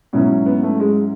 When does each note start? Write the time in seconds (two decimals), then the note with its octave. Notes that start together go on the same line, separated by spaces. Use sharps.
0.13 G#2 B2 F#3 C#4 E4
0.46 B3
0.63 A3
0.80 G#3